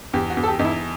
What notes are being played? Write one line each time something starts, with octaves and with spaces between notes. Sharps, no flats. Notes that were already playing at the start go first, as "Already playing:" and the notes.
E2 G4
F#4
E2
A4
G4
E2 D#4
E4